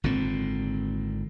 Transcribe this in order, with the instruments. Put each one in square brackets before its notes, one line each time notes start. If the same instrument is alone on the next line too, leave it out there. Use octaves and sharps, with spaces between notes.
[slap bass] G#1 A#2 D3 C4